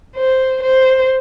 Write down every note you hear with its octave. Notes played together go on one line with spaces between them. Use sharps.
C5
C5